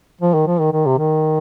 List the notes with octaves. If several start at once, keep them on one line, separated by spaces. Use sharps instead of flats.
F3
D#3
F3
D#3
D#3
C3
D#3